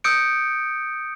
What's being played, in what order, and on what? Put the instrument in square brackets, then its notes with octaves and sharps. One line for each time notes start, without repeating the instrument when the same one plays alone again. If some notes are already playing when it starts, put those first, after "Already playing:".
[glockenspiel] D#6 E6 G6 C#7 D7